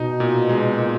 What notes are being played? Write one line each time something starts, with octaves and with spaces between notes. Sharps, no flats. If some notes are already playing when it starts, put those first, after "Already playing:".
Already playing: B2 D#4
A#2
G#3
A#2